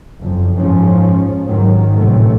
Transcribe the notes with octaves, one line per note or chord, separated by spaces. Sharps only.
F#1 F2
G#2 F3 C#4
G#2 D#3 F#3
A1 F#2 C3 E3 F#3 A3